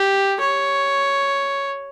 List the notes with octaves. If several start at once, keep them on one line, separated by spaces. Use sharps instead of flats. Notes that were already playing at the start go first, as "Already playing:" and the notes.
Already playing: G4
C#5